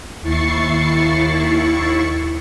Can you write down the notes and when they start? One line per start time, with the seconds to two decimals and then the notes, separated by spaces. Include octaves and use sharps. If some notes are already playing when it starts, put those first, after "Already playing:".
0.22 D#2 E4 C#6 A6 C7 C#7